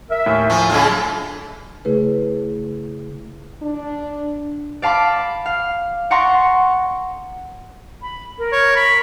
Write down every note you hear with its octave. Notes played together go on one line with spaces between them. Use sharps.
A#4 E5 E6
D#2 A2 G#5 C#6
F3 F4 G#5 A5
C#3 F#3 G#3 D4 F4 A4 E6
C#3 A3 E4 G#4 B4
D4
D5 F5 A5 B5 D6
F5
D5 F#5 A#5 C6 C#6 A#6
B5
A#4
C#5
B5